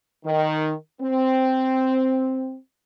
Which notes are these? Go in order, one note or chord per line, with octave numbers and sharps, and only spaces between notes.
D#3
C4